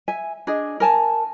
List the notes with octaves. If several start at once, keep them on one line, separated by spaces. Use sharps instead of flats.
E5 G#5
D4 G#4 D#5
A#4 G#5 A5